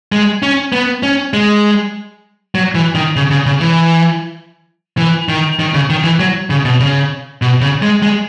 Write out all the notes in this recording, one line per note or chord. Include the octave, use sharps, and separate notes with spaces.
G#3
C#4
B3
C#4
G#3
F#3
E3
D#3
C#3
C#3
C#3
E3
E3
D#3
D#3
C#3
D#3
E3
F#3
C#3
B2
C#3
B2
C#3
G#3
G#3